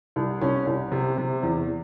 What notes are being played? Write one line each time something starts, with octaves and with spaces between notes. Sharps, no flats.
C2
C2 C#4
C2
C3
C3
E2